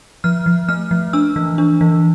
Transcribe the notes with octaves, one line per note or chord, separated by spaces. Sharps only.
F3 F6
F3
A3 F6
F3
D4 E6
E3
D4
E3